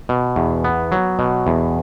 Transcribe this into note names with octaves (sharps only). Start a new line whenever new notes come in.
B2
E2
B3
F#3
B2
E2